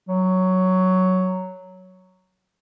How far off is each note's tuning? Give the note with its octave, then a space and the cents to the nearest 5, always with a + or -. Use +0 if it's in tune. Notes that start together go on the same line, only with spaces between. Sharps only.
F#3 +5